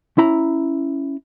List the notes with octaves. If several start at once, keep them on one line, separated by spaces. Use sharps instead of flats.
C#4 E4 A#5